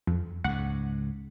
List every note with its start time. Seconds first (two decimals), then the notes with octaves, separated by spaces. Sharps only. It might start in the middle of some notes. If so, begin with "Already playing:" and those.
0.07 F2
0.44 C#2 G#2 F#5